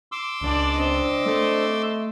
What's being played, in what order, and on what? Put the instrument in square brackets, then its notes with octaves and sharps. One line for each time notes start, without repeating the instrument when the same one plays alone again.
[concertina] C6 D6 E6
[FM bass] C#2 [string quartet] D4 D5
[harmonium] C4 D4 [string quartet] D#5
[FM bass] A3